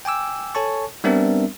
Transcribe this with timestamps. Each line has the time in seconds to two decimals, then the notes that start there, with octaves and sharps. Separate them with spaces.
0.05 G5 G#5 D6 E6
0.55 A4 C#5 G#5 A5 C#6
1.04 G3 B3 C4 D4 A#4 E5